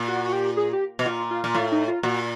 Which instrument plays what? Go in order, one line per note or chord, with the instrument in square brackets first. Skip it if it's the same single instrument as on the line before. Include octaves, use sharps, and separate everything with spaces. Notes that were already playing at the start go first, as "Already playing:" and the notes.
Already playing: [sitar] A#2
[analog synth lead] F#4
F#4
G4
G#4
G4
[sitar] B2
[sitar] A#2 [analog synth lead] F4
[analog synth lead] F4
[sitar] A#2
[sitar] A2 [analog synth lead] F4
[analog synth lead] D#4
F4
[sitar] A#2 [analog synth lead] F#4